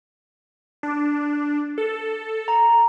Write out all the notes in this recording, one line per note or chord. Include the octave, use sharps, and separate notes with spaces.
D4
A4
A#5